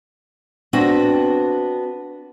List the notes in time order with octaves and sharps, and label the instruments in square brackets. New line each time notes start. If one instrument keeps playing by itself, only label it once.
[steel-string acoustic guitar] B3 C4 D4 F#4 B4